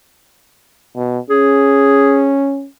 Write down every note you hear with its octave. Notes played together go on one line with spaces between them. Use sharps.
B2
C#4 G#4